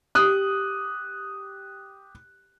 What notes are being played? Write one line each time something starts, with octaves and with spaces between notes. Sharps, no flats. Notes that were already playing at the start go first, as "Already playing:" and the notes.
G4 D#6 F#6